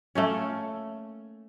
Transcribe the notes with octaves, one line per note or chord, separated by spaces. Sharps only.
A3 A#3 C#4